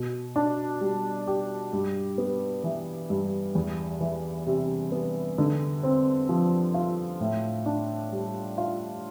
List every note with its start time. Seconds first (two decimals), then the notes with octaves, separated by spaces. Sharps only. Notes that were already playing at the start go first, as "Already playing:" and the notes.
Already playing: B2
0.36 D4
0.81 G3
1.27 G4
1.73 G2
2.18 B3
2.64 E3
3.10 G2
3.55 E2
4.01 E3
4.47 C3
4.92 B3
5.38 D3
5.83 C4
6.29 F3
6.74 F4
7.20 A2
7.66 D4
8.12 G3
8.58 F4